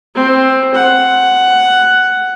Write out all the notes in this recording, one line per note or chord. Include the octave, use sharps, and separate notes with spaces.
C4
F#5